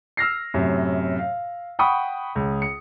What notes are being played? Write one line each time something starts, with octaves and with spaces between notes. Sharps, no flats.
E6 F6 A#6 C7
F#2 A2 C3
F5
F#5 G5 B5 C#6 D#6
C#2
C#7